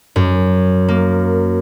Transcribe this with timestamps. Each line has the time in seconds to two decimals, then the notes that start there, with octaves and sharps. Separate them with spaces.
0.16 F#2
0.88 A#3